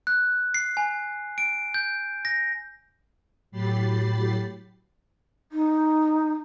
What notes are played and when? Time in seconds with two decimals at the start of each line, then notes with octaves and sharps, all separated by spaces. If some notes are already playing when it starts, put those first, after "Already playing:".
0.07 F#6
0.54 C7
0.77 G#5
1.38 D7
1.74 G6
2.25 A#6
3.51 A2 F#3 G4 B5 A6 C7
5.52 D#4